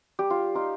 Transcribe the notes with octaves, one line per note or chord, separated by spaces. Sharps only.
G3 G4
F4
D#4 F4